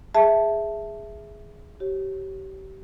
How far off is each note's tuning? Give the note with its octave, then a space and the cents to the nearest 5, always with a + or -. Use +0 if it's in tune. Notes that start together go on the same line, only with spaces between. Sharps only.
G#4 +0 E5 +0 A5 +0
G4 -30 C#5 -25